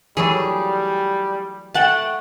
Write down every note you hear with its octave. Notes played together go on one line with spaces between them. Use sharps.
E3 F#3 G3 A3 G#4
A3 F#5 G5 A5